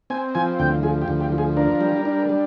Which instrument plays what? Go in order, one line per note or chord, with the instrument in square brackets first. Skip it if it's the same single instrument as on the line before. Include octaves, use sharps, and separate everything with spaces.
[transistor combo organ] C4 G#5
F3 G#5
D2 G5
F3 G#4
G4
D2
G4
F3
G#4
D4 A#4
G3
D4
G3